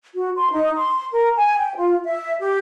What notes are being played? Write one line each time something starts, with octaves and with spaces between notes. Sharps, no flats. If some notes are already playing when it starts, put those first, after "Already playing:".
F#4
C6
D#4
C6
A#4
G#5
G5
F4
E5
G4